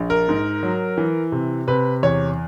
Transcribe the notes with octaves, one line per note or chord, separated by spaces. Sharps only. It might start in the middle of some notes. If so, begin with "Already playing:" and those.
Already playing: A#1
A#4
G#2
F#3
E3
C3
C3 B4
E2 C#5